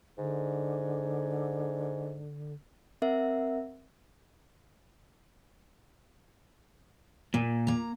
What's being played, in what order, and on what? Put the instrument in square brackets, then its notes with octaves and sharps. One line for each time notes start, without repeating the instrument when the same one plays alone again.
[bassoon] G#2 [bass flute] D3
[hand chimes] C4 A#4 E5 F#5
[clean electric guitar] A#2 [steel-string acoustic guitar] A#3
[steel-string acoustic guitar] A#3 A#5